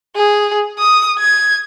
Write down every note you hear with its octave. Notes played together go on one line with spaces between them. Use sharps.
G#4
D#6
G#6